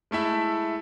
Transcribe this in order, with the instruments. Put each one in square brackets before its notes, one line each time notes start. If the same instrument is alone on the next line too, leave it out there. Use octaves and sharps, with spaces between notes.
[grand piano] G#3 A3 E4 E5